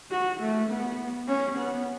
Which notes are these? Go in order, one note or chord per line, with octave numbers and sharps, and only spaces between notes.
F#4
A3
B3
C#4
B3